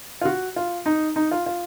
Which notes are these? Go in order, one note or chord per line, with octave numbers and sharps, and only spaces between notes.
F4
F#4
F4
D#4
D#4
F4
F4